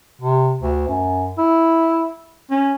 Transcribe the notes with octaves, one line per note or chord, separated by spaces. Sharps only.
C3
D2
F#2
E4
C#4